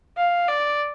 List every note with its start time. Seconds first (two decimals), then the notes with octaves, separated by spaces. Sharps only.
0.17 F5
0.48 D5